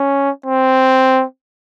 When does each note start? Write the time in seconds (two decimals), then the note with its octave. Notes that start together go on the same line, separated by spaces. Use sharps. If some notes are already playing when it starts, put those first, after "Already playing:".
Already playing: C#4
0.46 C4